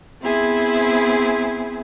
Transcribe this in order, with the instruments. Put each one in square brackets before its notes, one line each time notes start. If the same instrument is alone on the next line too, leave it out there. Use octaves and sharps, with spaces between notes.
[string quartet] B3 C4 E4 G#4